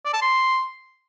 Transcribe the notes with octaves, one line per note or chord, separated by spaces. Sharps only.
D5
A5
C6